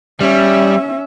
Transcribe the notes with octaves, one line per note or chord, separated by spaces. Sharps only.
G3 C#4 E5